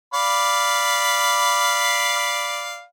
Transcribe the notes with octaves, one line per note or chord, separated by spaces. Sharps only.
D5 F5 B5